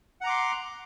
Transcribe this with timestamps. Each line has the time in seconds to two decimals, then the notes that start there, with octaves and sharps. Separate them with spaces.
0.21 F#5
0.24 A#5
0.27 D6
0.29 C6